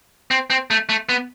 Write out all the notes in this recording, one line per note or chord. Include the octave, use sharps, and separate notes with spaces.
C4
C4
A3
A3
B3